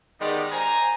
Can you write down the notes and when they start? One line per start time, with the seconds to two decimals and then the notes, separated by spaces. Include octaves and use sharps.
0.21 D#3 G#3 B3 D#4 G4 D5
0.52 C5 G#5 A#5